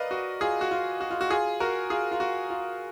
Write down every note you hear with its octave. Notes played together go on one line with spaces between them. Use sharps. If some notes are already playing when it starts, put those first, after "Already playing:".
Already playing: A#4 B4 D5 D#5 F5
F#4
F4 G#4
F#4
F4
F#4
F4
F#4
F4 G#4
F#4 A#4
F4 G#4
F4
F#4
F4